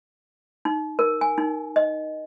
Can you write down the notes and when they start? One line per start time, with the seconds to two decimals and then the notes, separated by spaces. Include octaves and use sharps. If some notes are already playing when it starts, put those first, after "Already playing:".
0.65 D#4
0.99 A#4
1.21 G#5
1.38 D#4
1.76 D#5